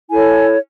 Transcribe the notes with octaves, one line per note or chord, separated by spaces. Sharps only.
E4 A4 C#5 G#5